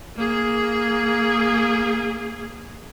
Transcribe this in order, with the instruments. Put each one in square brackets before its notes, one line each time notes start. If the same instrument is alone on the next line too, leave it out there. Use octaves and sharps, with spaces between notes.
[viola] A#3 G#4